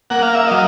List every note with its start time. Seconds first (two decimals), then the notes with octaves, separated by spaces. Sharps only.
0.10 A#3 F#5
0.23 F5
0.34 E5
0.46 F#3 D#5 F5